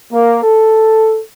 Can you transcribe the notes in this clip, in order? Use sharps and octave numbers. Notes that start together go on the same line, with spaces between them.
A#3
A4